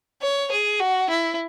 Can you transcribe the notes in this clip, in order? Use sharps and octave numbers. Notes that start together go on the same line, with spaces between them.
C#5
G#4
F#4
E4